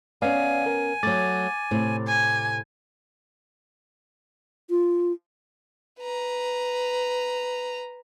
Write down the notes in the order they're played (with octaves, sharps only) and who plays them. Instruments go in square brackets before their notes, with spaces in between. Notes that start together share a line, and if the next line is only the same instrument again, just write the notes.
[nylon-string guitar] B3 C#4 [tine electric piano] D5 F5 [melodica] G#5
[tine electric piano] A#4
[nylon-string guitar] F#3 A3 [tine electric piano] D6 A6
[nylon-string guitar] A2 C3
[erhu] G#5
[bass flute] F4
[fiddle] B4 A#5